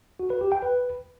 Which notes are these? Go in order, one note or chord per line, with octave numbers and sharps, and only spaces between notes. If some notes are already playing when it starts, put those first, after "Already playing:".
F#4
B4
G4
G5
B4